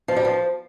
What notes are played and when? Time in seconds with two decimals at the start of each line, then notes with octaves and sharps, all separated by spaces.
0.08 F3
0.16 G3
0.25 F3